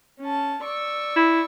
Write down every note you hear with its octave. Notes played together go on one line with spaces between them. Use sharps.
C#4 A5
D5 C#6 E6
E4